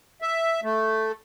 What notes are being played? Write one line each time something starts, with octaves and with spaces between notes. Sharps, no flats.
E5
A3